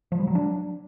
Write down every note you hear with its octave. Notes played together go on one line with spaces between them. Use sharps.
F3
G3
F#3
D4